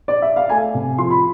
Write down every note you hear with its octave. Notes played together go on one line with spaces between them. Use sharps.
D5
E5
F5
A3 G#5
C3
F3 C6
B5